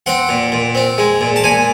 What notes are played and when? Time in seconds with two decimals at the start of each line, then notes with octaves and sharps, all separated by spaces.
0.06 C4 F#5
0.29 A#2
0.52 A#2
0.75 C4
0.98 G#3
1.21 A#2
1.36 A5
1.44 A#2 G#5